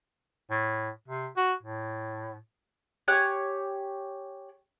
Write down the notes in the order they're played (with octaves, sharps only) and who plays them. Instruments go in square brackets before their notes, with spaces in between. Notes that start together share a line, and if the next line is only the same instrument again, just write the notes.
[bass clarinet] A2
C3
F#4
A2
[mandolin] G4 C#5 G#5 F#6